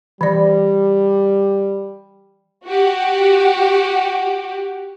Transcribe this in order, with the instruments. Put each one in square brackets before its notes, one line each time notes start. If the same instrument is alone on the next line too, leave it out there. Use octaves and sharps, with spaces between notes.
[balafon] E3 D5 [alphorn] G3
[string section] F#4 G4